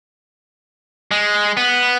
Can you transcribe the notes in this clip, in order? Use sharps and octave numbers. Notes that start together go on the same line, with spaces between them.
G#3
B3